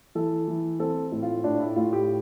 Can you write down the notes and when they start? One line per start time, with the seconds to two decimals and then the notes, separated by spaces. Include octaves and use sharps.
0.15 E3 A4
0.48 E3
0.79 C4 A4
1.12 A2
1.22 F4
1.44 A2 D4
1.60 E4
1.76 A2 F4
1.93 G4